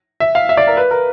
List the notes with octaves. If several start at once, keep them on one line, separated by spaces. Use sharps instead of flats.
E5
F5
E5
D5
A#4
B4
A#4